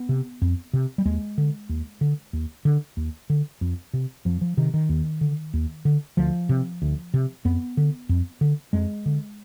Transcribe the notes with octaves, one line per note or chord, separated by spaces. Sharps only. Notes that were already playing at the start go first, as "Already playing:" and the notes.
Already playing: B3
C3
F2
C3
G3
D#2 G#3
D3
D#2
D3
D#2
D3
D#2
D3
F2
C3
F2 F3
F3
C3 D#3
D#3
D#2
D3
D#2
D3
D2 F3
C3
D2
C3
F2 B3
D3
F2
D3
F2 G#3
D3